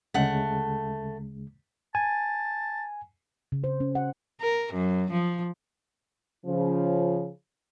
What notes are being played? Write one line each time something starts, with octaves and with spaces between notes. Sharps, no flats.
D2 C#3 G#3 A3 F#5
G#5 A5
C#3
C5
C#4
F#5
A#4
F#2
F3
C#3 F3